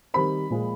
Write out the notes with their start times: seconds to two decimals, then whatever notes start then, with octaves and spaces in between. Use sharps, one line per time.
0.14 D#3 G3 C4 B5
0.50 A#2 F3 G#3